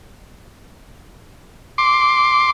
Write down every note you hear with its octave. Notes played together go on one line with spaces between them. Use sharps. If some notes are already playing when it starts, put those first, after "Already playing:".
C6 D6